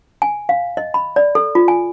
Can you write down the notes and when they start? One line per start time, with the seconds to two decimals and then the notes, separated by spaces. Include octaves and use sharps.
0.22 G#5
0.49 F5
0.77 D#5
0.94 B5
1.16 D5
1.35 A4
1.55 F4
1.68 G#5